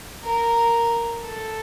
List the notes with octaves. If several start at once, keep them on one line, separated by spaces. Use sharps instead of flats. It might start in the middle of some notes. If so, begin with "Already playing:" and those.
A#4
A4